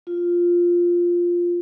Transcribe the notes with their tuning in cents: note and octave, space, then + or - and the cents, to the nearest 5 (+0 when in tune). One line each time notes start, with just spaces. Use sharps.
F4 +0